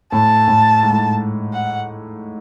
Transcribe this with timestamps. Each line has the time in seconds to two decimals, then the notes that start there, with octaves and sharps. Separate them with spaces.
0.12 A2 A5
0.48 A2
0.83 G#2
0.90 A2
0.98 G#2
1.53 F#5